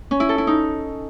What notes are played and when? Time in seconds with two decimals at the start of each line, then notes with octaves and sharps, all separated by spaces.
0.11 C#4
0.20 E4
0.29 A4
0.38 E4
0.47 D#4